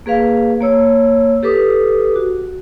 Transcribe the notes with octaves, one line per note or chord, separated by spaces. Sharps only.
A#3 G#4 B4 F5
A#3 C#5 E6
G4 A4 B4 D6 D#6
F#4